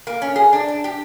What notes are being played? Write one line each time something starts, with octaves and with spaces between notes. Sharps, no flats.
A#3
C#4
G#4
D4
D4
G4